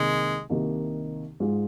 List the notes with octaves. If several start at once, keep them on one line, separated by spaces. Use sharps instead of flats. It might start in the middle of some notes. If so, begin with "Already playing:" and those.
Already playing: C2 C3 D#3 G#3 A#3 D#4
C2 C3 D#3 A#3 D#4
G#2 G#3 F4 G#4